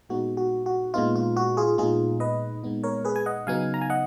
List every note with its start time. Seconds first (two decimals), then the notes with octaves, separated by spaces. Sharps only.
0.09 A#2 G#3 B3 D#4 F#4
0.37 F#4
0.66 F#4
0.94 A#2 G#3 B3 D#4 F4
1.16 F4
1.37 F#4
1.57 F4 G#4
1.78 A#2 G#3 B3 D#4 F4 G#4
2.20 B4 D#5
2.64 A#2 G#3 B3 D#4
2.83 A#4 C#5
3.05 G#4 B4
3.16 G#5
3.26 D#5 F#5
3.47 C#3 F#3 B3 D#4 F5 G#5
3.74 A#5
3.82 G#5
3.90 D#5 F#5